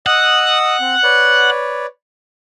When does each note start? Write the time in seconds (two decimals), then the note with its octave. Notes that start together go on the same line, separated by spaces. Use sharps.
0.06 D#5 F#5 D#6 E6
0.80 C4
1.03 B4 C#5 D5